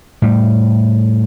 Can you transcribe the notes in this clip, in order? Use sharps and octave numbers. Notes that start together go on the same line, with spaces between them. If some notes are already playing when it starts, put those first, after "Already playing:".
A2 G3